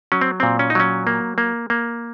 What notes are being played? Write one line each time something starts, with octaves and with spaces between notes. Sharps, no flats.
F#3 C#4
C4
A#2 C4
C#4
D#4
F#3 C#4
A#3
A#3
A#3